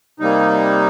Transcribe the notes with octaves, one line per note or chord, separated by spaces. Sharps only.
C3 G3 A#3 D#4